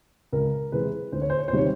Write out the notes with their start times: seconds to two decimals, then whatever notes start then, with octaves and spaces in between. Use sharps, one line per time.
0.33 C#2 A#4
0.72 C3 E3 G#3 B4
1.12 D2 C5
1.21 C#5
1.30 C5
1.39 C#5
1.48 C5
1.52 C3 D#3 G3 C#5